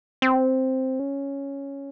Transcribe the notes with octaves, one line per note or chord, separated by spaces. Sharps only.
C4
C#4